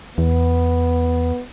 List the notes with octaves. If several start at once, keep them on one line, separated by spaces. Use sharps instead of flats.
E2 B3